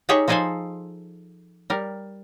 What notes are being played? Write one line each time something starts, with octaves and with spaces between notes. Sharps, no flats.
D#4 G4 G#4 C#5 E5
F3 D#4 G#4 A4 C5 G#5
G3 A#4